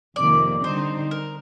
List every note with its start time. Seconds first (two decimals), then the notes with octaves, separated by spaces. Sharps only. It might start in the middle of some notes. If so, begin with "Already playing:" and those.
0.16 F2 C3 D#3 A#3 D5
0.63 D3 G3 C4 D#4 C5
1.11 A#4